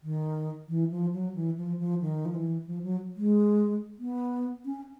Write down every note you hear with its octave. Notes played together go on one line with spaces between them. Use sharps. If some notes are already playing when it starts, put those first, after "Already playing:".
D#3
E3
F3
F#3
E3
F3
F3
D#3
F3
E3
F3
F#3
G#3
B3
C#4